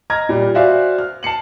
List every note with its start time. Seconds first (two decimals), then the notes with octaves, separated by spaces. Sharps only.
0.10 D#5 A#5 F6 G#6 A#6
0.29 A#2 G3
0.55 F#4 C5 D5 E5 F5 G#5
0.99 F6
1.23 A5 C7 C#7 F#7